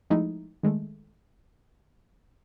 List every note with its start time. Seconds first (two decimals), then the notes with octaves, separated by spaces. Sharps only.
0.10 F3 G#3 A3 D#4 E4
0.63 D#3 G#3 A3